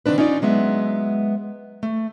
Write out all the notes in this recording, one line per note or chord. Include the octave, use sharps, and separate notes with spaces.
D3 D#3 F3 C4 D4 B4
C#4 D#4 F4 D5
F#3 G#3 B3 E5
A3